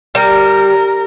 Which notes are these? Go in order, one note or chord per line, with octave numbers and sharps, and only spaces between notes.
G3 A#4